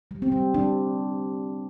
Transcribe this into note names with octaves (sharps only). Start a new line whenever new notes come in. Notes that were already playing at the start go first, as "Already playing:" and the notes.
G3
C4
G3
G3 D4